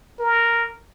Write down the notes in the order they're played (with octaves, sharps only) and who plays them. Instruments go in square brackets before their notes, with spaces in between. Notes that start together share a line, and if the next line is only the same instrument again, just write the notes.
[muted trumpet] A#4